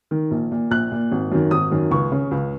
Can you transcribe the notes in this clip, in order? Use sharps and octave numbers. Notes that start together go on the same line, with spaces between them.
D#3
A#1
A#2
A#1 F#6
A#2
G#1
F#2 D#3
G#1 D#6
F#2 D#3
C#2 C#6
C#3
C#2